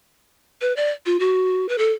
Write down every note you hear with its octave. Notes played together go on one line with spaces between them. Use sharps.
B4
D5
F4
F#4
B4
A4